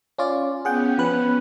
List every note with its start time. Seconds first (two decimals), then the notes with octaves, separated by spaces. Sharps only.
0.18 C#4 F4 D5
0.65 B3 C#4 G#4 F#5 G5
0.98 F3 B4 F#6